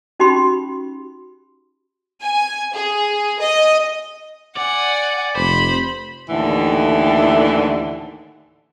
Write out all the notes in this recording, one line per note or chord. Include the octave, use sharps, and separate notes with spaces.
C#4 D#4 F#4 G4 B5 C6
G#5
G#4
D#5
D5 F#5 G#5
F1 C5 B5
D#2 A2 D3 E3